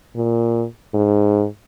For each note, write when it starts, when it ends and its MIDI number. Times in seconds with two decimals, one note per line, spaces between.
0.16 0.65 46
0.94 1.45 44